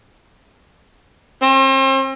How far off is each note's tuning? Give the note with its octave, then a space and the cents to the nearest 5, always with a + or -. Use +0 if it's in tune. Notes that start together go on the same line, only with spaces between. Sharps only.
C4 +40